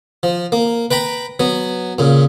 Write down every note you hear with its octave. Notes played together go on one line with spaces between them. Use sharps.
F3
A#3
B4 G5 A#5 B5
F#3 B3
A#2 C#3